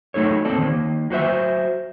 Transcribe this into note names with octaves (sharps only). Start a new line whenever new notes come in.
F#3 A3 D#4 A4 C#5
A#3 C4 A4 D5
D#3 A#3
F#3 F#4 C5 E5